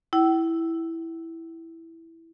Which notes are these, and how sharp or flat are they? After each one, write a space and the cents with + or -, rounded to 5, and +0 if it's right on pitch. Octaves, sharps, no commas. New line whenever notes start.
E4 +0 G5 -40